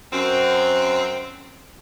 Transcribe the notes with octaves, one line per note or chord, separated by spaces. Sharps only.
F#2 C4